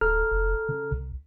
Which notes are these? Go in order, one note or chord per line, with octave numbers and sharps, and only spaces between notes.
D1 A4 A#5 F6
F1
C#3
C2